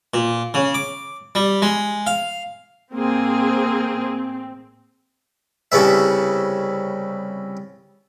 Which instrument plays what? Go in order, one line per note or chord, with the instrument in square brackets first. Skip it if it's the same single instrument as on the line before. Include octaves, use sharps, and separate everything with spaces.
[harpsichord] A#2
C#3
D6
G3
G#3
F5
[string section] A1 C4 [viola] A#3 G#4
[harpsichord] C2 C#3 B3 E5